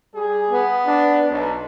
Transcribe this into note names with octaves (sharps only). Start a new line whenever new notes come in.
G3 G4 G#4
B3
D4
B1